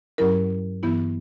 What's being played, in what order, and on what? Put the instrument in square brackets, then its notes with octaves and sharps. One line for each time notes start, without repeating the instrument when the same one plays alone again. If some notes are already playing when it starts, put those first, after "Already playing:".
[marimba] G2 F#3 C#4 E4 A#4
G2 E3 B3 E4